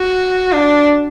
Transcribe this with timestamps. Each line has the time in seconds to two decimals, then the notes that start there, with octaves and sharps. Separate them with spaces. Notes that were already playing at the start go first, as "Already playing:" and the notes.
Already playing: F#4
0.52 D4